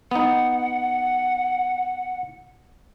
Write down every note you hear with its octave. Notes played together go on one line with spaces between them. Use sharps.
B3 D#4 F#5